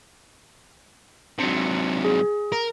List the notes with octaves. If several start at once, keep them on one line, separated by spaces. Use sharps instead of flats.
C3 F#3 D4 C#7
G#4
A#4